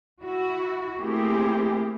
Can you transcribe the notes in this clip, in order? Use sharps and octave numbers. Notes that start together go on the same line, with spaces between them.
E4 F#4
A3 A#3 C4 E4 G4 G#4